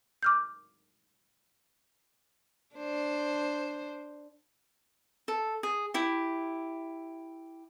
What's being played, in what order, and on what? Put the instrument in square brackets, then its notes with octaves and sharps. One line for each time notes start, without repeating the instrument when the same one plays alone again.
[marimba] D6 F6 G6
[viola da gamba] D4 C5
[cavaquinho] A4
G#4
E4 G4